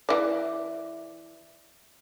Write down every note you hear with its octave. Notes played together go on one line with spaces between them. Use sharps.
E3 D5